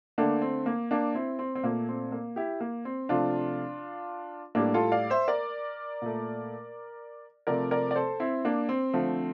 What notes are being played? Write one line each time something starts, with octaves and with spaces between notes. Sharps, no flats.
D3 A3 A#3 D4
C4
A#3
A#3 D4
C4 E4
C4
C4
A#2 A3 A#3
C4
A#3
E4 G4
A#3
C4
C3 F3 A3 D4 F4
A2 G3 A#3 D4
F4 A4
D5 F5
C5 E5
A#4 D5
A#2 A3
C3 F3 A3 A#4 D5
A#4 D5
D5
A4 C5
C4 E4
A#3 D4
C4
D3 F3 A3